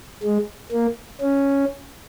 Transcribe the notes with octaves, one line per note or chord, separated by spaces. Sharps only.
G#3
A#3
C#4